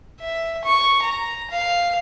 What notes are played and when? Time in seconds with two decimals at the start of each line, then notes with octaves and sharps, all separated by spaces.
0.21 E5
0.64 C#6
1.03 A#5
1.51 F5